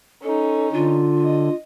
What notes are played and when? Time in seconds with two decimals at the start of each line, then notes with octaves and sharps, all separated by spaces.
0.23 C#4 D#4 A4
0.73 D3 F4
1.24 D#5